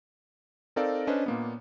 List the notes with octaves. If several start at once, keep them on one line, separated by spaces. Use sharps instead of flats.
C4 D#4 A4 A#4 D5 F5
C#4 D4 B4 C5 D#5
A#2 A#3 B3